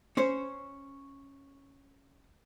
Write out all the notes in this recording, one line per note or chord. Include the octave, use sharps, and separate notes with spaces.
C#4 C5 C#5